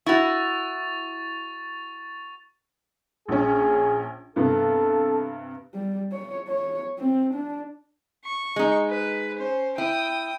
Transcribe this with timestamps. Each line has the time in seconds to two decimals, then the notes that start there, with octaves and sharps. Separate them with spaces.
0.06 E4 F#4 C#6 A6 F7
3.28 A#1 C#4 G#4
4.36 G2 C3 B3 A4
5.75 G3
6.12 C#5
6.48 C#5
6.99 C4
7.34 D4
8.25 C#6
8.56 G#3 D#4
8.89 B4
9.37 C#4 C5
9.78 E4 G5 D#6